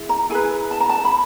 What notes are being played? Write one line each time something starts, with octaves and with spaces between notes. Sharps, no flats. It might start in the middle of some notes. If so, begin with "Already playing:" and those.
Already playing: E4 G#4
A#5
E4 G#4 B4 G#5
A5
A#5
A5
B5